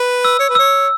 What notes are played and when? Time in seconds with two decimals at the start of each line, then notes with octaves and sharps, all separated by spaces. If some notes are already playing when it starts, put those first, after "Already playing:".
Already playing: B4
0.25 E6
0.39 C#5
0.49 B4
0.55 C#5 E6